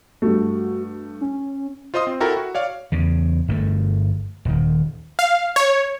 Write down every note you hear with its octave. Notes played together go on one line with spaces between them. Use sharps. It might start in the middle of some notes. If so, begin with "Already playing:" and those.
G2 A3 F#4
C#4
F4 C5 D#5 C6 D#6
C4
E4 F#4 A4 A#4 G5 A#5
F#4
C#5 D5 F5
E2 C#3
G1 G2 C#3 A3
D#1 D#3
F5
C#5